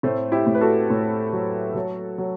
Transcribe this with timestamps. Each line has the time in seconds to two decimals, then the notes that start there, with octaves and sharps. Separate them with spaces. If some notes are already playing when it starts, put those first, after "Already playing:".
0.03 A2 A3 C4
0.32 E4 G4
0.47 A2
0.55 B4
0.61 F#4 A4
0.90 A2
1.33 F#3
1.75 F#3
2.18 F#3